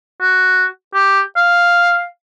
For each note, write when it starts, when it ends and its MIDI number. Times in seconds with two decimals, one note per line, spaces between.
0.21 0.66 66
0.94 1.20 67
1.36 2.04 77